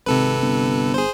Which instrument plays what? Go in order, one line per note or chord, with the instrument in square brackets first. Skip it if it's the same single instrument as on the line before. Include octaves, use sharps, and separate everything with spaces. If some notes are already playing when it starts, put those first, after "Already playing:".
[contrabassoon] G#1 [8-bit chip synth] C3 A4 B4
[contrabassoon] G1
[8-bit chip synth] G#4 C5